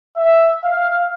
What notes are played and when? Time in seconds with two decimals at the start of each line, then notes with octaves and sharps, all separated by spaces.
0.17 E5
0.63 F5